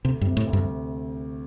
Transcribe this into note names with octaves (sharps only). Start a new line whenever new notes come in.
D2 C3
G2
C3
A2
D2
G2